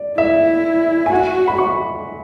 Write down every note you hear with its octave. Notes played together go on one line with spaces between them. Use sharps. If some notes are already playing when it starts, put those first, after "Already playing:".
Already playing: D5
E4 E5
G#5
F#4 F#5
B5
C#6